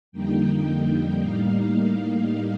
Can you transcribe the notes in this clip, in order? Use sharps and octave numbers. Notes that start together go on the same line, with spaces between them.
F2 D3 G3 A#3 D#4 G5
A2 G3 A#3 D#4 F5